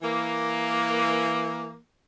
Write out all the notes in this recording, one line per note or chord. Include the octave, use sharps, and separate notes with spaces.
E3 A#3